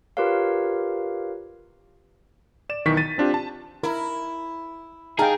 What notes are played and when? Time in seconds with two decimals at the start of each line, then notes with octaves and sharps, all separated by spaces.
0.17 F4 G4 A#4 B4 C#5 F5
2.69 D5 E7
2.85 B1 D#3 E3 C#6 B6
2.97 A6 D#7
3.18 C4 D4 F4 G4
3.34 A5
3.83 E4 A#4
5.19 D#4 G#4 F5 G5 A5 A#5